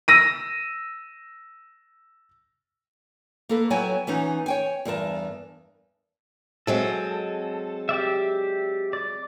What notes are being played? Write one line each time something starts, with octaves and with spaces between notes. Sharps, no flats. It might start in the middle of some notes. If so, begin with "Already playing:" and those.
E6 A#6 D#7
A#3 A4 B4
F#3 B3 E4 C#5 G5 G#5
E3 B3 C#4 D#4
C#5 G5 G#5
E2 G2 A#4 A5
F#3 G#3 C4 A4
G4 D5 E5
D5